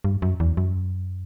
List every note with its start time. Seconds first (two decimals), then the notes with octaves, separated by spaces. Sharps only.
0.04 G2
0.22 F#2
0.40 E2
0.57 F#2